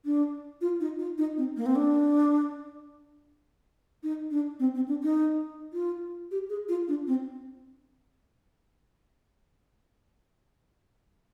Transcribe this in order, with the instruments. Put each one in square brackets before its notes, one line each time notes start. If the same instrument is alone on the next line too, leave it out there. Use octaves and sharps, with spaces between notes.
[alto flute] D4
F4
D#4
F4
D#4
C4
A#3
C4
D4
D#4
D4
C4
C4
D4
D#4
F4
G4
G#4
F4
D4
C4